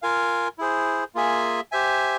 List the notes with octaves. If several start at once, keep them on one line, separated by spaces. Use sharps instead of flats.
F4 A#4 F5 G#5
E4 G#4 C5
A#3 F4 G#4 E5 G#5
G4 C5 E5 G#5